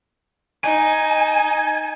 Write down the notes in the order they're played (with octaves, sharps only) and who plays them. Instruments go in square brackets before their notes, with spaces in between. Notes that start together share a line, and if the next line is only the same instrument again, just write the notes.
[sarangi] D#4 [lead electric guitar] G#5